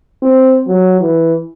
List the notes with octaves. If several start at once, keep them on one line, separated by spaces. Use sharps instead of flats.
C4
F#3
E3